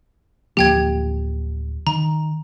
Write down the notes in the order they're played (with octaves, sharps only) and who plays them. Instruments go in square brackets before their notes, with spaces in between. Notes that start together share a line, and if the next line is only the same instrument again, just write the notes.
[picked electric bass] D1 F3 A#3 [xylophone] G4 G5 G#6
[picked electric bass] D#3 [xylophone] A#5